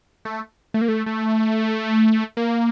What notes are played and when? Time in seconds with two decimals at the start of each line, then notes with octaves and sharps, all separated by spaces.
0.25 A3
0.74 A3
0.81 A#3
0.88 A3
1.06 A3
2.37 A#3